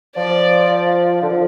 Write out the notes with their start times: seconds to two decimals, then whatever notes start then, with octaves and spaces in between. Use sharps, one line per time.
0.16 F3 D5
1.22 D3
1.31 F3